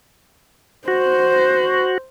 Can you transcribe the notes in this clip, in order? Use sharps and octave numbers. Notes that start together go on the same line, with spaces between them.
F#4 C5